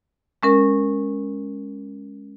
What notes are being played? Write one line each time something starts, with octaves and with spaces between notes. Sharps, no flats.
G#3 C#4 A#4